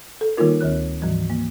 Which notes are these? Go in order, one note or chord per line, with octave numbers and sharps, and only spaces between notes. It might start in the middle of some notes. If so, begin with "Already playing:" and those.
A4
D#3 G3 A#3 D#4 F4 A#4
D2 D#3 C#5 F#6
G#2 E3 F3 G3
A#3